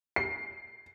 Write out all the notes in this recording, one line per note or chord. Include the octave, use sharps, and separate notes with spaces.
C7